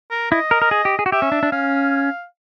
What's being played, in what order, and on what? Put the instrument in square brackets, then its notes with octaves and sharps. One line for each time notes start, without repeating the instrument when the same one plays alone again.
[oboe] A#4
[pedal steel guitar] E4 [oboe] D#5
[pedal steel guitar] A#4
A#4
G#4
G4
G#4
F#4
[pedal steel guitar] G4 [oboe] E5
[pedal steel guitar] C#4
D4
D4
[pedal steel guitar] C#4 [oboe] F5